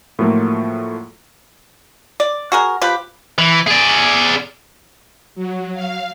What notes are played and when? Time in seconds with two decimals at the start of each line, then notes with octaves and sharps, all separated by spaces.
0.19 A2 F3 F#3 A3 A#3 F4
2.20 D5
2.52 F#4 G#4 A#4
2.82 F3 G4 B4
3.38 E3
3.67 G#4 D5
5.35 F#3
5.74 F5